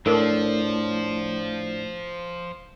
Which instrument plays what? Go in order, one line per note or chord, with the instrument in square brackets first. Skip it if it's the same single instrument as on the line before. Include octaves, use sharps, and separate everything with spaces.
[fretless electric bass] A2 [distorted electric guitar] F3 [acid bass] D4 [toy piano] A4 A#4